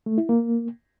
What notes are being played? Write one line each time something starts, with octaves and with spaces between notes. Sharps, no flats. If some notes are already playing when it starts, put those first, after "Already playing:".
A3
E4
A#3